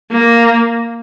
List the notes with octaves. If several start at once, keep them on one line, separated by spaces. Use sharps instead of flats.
A#3